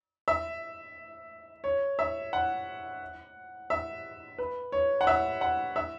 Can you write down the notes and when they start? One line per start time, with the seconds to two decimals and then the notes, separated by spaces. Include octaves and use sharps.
0.28 E5
1.64 C#5
1.99 E5
2.33 F#5
3.70 E5
4.38 B4
4.72 C#5
5.01 F#5
5.07 E5
5.41 F#5
5.76 E5